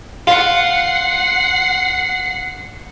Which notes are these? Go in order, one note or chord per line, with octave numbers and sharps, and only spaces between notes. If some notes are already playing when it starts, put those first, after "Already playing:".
F4 F#5 C7